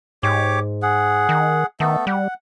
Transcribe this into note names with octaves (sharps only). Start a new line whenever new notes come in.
G#2 G4 C#5 D6
G#4 F#5
D#3
D#3 A3 B3 A4
G3 F#5